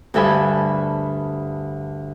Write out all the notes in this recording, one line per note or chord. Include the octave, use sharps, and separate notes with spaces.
D2 G2 A4 G#5 B5